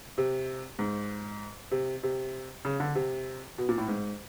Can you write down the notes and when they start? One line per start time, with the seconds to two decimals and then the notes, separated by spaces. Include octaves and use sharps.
0.18 C3
0.79 G#2
1.71 C3
2.03 C3
2.65 C#3
2.80 D3
2.95 C3
3.58 B2
3.69 A#2
3.78 A2
3.88 G#2